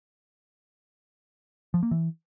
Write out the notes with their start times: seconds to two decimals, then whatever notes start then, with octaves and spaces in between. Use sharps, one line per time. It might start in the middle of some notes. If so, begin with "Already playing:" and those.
1.74 F3
1.83 A#3
1.91 E3